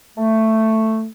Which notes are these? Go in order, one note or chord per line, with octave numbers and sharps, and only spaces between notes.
A3